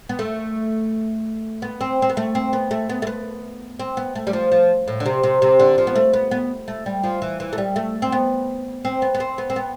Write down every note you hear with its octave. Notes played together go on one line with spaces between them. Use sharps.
B3
A3
B3
C4
C4
B3
A3
C4
B3
A3
B3
A3
B3
C4
B3
A3
G3
F3
F3
A2
D3
C3
C3
C3
D3
F3
B3
A3
B3
B3
A3
G3
F3
E3
E3
A3
G3
A3
C4
B3
C4
B3
B3
C4
B3
C4
B3